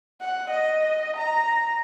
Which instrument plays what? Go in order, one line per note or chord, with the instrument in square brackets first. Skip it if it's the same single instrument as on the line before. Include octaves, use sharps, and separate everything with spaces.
[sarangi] F#5
D#5
A#5